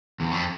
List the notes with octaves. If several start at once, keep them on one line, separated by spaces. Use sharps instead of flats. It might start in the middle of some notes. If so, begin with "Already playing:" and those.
E2
F2